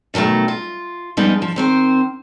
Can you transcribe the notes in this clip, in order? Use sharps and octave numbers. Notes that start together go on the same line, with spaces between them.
B2 D#3 F3 F#3 A3
F4
C#3 F3 G3 G#3 B3 D#4
F3
D#3 C4 C5